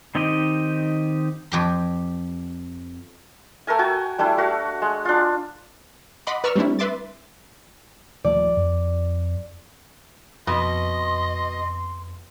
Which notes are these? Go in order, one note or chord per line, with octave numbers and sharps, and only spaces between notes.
D#3 C4 D#4 G4 D#5
F2 G4 C6
A3 A4 A#4 G#5
F#4 G5 G#5 A#5
G3 A3 D4 E4
A3 F#4 F5
G#3
D4 F4
D#5 F#5 B5 C6 D6
B4 D5 A#5 C#6 E6 F6
G3 A3 C4 D4 E4
B4 E5 C6 D6 A6
D#1 F3 A3 D5
F2
F2 B2 D#5 C6